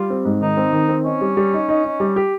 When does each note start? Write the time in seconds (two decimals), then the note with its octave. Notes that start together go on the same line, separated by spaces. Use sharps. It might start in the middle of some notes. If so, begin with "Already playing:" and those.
Already playing: G3 F4
0.10 C4
0.25 G#2
0.41 D#3 D#4
0.57 C4
0.73 D#3
0.89 C4
1.05 C#4 D#4
1.21 G3
1.37 G3
1.53 D#4
1.69 D#4
1.84 D#4
2.00 G3
2.16 G4